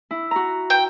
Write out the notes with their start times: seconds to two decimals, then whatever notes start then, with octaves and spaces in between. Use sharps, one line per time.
0.11 E4
0.31 F#4 A#5
0.70 G5